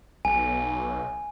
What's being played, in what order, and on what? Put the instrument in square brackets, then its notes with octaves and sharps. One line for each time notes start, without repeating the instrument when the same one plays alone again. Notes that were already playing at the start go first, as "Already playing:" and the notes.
[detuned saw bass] B1 [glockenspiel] G#5